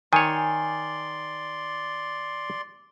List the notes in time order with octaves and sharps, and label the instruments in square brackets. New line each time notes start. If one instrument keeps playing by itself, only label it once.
[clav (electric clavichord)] D#3 C#5 [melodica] D5 C6 [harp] G#5